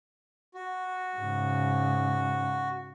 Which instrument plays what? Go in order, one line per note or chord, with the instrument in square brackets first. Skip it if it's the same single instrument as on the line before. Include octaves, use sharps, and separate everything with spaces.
[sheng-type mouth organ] F#4
[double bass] G#2 C#3